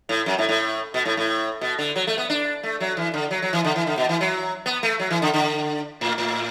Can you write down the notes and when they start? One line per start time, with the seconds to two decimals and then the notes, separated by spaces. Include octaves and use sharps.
0.09 A2
0.26 F#2
0.38 A2
0.49 A2
0.94 B2
1.05 A2
1.17 A2
1.61 B2
1.79 D3
1.96 F#3
2.07 A3
2.18 B3
2.30 D4
2.63 A3
2.80 F#3
2.97 E3
3.14 D3
3.31 F#3
3.42 F#3
3.53 E3
3.64 D3
3.76 E3
3.87 D3
3.98 B2
4.09 E3
4.21 F#3
4.66 B3
4.83 A3
5.00 F#3
5.10 E3
5.22 D3
5.34 D3
6.01 A2
6.18 A2